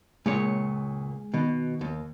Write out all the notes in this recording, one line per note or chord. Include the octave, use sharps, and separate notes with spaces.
C#2 A#2 G#3 C#5
B2 D#3
D#2